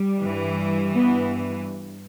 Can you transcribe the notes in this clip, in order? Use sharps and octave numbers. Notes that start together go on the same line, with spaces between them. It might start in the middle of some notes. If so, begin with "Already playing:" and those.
Already playing: G3
G2 E3
B3